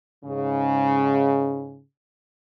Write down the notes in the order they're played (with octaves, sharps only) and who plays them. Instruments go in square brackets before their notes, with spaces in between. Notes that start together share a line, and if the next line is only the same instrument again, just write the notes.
[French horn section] G#2 C#3